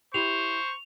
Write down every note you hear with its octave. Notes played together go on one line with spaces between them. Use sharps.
E4 G4 C5 C#6 F7